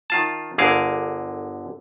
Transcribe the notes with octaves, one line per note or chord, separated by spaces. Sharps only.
D#3 F4 A5
G1 D3 G#4 A#4 F5